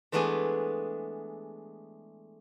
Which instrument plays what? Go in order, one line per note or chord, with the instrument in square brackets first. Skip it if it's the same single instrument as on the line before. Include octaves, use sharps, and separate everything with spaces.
[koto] E3 G#3 A3 B3 D4 G#4